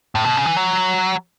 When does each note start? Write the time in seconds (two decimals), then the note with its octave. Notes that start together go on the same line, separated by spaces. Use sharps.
0.15 A2
0.25 B2
0.36 C#3
0.45 E3
0.57 F#3